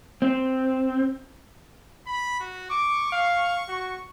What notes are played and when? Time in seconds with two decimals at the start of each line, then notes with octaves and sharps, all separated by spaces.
0.22 C4
2.07 B5
2.40 F#4
2.71 C#6 D6
3.12 F5
3.68 F#4